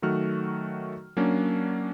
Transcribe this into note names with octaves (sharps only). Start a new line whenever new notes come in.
D#3 F#3 A3 F#4 F6
F#3 A#3 C#4 D4